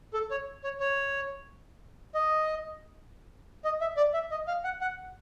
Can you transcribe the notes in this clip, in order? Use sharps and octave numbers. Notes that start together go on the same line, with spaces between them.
A4
C#5
C#5
C#5
D#5
D#5
E5
D5
E5
D#5
F5
F#5
F#5